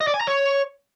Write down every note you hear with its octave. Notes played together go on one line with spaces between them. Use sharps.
D#5
D5
G#5
A#5
C#5